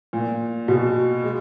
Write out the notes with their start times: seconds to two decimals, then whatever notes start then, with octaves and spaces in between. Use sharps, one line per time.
0.13 A#2
0.68 B2
1.24 G#3